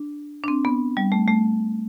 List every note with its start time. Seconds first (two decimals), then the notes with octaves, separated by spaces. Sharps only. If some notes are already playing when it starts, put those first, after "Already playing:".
Already playing: D4
0.44 D4
0.48 C4
0.65 B3
0.97 G3
1.12 A3
1.28 A3